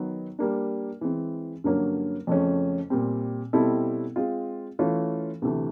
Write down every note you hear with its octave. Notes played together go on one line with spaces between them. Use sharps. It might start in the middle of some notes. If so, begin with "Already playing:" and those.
Already playing: D#3 F#3 B3
G3 A#3 D4
E3 G#3 C4
G2 D3 F#3 A#3 C#4
F2 C#3 F3 A3 C#4
A#2 G3 C4
B2 G3 C4 E4 A4
G#3 C4 F4
E3 A3 C#4 F4
D2 C3 E3 A3